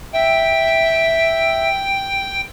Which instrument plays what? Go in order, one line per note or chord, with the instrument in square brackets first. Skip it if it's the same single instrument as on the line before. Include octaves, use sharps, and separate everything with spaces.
[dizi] E5 [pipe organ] G5